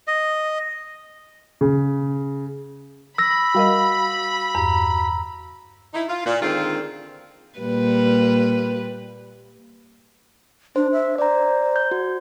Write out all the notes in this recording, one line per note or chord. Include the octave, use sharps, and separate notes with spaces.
D#5
C#3
B5 E6 A#6
G3 F#4 A#4 D#5 F5
E2 G2 A#5
D#4 E4
F4
A#2
D3 D#3 G#3 A#3 C4 F4
A#2 G3 B4
D4 C5
E5
C5 D5 A#5
G6
F#4